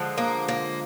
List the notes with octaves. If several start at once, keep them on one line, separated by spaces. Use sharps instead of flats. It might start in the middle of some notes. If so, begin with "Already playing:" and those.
Already playing: D3 F3 G#3
A#3
A#3